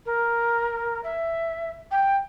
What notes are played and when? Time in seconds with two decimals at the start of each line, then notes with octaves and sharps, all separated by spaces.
0.06 A#4
1.04 E5
1.91 G5